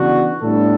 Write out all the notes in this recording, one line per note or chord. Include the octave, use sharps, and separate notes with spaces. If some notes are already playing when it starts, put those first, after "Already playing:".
Already playing: C#3 E3 B3 D4 F#4
A2 G3 B3 D4 A4